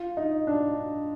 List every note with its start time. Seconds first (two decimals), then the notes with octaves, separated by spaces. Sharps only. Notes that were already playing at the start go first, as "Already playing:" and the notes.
Already playing: F4
0.17 D#4
0.47 D4